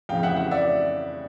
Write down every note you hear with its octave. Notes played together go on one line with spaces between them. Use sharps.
F2 C#3 E3 F5 G5
E5 F#5
E5 F#5
D5 E5